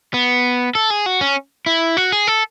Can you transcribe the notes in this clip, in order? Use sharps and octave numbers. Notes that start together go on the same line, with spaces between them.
B3
A4
G#4
F#4
C#4
E4
F#4
G#4
A4